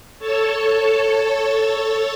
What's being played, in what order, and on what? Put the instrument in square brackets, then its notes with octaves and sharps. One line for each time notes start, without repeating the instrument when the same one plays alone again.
[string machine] A4 C#5 A5